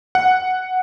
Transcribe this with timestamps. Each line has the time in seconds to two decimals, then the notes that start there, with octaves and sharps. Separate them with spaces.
0.15 F#5